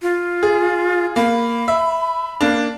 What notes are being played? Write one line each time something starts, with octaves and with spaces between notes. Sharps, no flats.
F4
G#4
A#3 B5
E5
A#3 D4